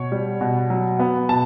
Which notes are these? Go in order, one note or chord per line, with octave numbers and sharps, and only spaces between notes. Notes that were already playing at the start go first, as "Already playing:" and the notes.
Already playing: B2 C#5
G3
B2
F#3
B3
B2 A5